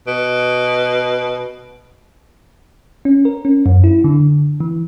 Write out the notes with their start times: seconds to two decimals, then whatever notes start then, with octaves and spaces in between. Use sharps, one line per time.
0.07 B2
3.05 C#4
3.25 A#4
3.45 C#4
3.66 F#2
3.84 E4
4.04 D3
4.60 E3